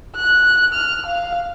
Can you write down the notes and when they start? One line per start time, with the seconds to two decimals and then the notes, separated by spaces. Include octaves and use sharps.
0.15 F#6
0.75 F6
1.07 F5